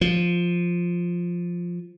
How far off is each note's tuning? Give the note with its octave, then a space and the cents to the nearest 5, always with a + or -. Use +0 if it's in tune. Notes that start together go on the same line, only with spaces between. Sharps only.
F3 +0